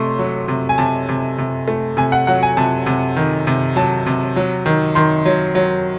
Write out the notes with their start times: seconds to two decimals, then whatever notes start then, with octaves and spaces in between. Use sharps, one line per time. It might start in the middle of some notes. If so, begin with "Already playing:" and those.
Already playing: C3 A3 C6 C#6
0.19 F#3
0.48 C3
0.69 G#5
0.78 C3 A5
1.09 C3
1.38 C3
1.68 A3
1.97 C3 G#5
2.12 F#5
2.27 F#3 F#5
2.43 G#5
2.57 C3 A5
2.86 C3
3.16 D#3
3.47 C3
3.76 F#3 A5
4.06 C3
4.36 F#3
4.66 D#3
4.95 D#3 C6
5.26 F#3
5.55 F#3